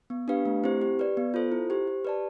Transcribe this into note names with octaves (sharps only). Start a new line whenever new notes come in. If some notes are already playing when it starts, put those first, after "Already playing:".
B3
D4 G4 B4 F5
A3
C4 E4 G4 C5
G4
B4 D5
B3
F4 A4 C5
E4
G4 C5
G4
B4 D5 A5